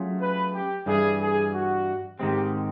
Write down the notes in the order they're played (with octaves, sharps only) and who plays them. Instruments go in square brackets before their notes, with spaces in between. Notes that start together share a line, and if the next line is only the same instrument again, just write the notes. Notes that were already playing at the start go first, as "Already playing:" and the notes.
Already playing: [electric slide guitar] F#3 A3 C#4 F4 G#4
[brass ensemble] B4
G4
[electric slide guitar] G2 E3 G3 [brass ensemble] G#4
[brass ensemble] G#4
F#4
[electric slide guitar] G#2 D#3 G#3 C4 [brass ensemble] G4